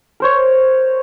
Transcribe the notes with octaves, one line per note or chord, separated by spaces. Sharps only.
A#4 C5 C#5